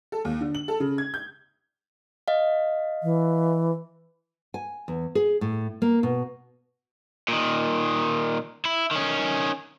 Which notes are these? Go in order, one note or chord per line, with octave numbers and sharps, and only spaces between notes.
A4
D#2
D3
F#7
A4
C#3
G#6
G6
D#5 F5
E3
G#5
E2
G#4
A2
A#3
B2
A#2 D#3
E4
D#3 C#4